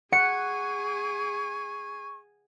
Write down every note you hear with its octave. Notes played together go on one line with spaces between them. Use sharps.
G#4 F#5 G#5 C#6 C#7